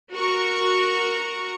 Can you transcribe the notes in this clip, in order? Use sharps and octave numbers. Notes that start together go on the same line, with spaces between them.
F#4 A#4 C#6